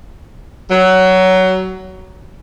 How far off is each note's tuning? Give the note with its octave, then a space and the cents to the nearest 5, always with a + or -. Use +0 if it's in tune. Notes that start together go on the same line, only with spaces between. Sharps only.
F#3 +15